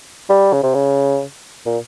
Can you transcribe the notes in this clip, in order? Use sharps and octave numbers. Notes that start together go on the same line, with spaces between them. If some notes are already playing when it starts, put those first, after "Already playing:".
G3
C#3
C3
C#3
A#2